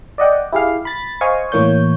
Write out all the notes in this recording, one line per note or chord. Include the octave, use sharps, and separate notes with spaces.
D5 D#5 F#5 G5
E4 G4 G#4 F5
B5 A6
C5 D#5 F5 G#5 C#6
A2 E3 A#3 C#5 G6